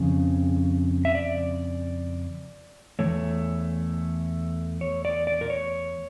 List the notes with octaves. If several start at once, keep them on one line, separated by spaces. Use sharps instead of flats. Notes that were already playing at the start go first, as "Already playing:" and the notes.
Already playing: F2 C#3
E5
D5
E2 E3 A3 C#5
C#5
D5
D5
A#4
C#5